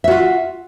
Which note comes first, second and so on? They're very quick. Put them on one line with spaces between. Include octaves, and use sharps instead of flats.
E5 F#4 F4